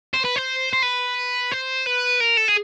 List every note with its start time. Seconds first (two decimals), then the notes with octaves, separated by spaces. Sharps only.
0.13 C5
0.24 B4
0.36 C5
0.73 C5
0.82 B4
1.51 C5
1.86 B4
2.20 A#4
2.37 A4
2.48 G#4